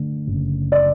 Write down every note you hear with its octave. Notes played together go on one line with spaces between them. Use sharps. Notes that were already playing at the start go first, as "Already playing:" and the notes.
Already playing: D3 A3
F#1
D5